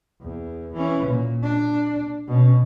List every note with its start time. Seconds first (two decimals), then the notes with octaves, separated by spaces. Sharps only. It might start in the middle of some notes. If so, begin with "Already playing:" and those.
0.22 E2
0.74 E3 C#4
1.06 A#2
1.43 D4
2.27 B2 C#4